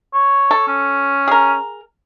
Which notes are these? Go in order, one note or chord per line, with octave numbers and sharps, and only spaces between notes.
C#5
A4
C#4
G#4 A#4